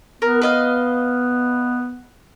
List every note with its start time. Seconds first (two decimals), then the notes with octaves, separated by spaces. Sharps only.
0.22 B3 A#4
0.42 B4 D#5 F5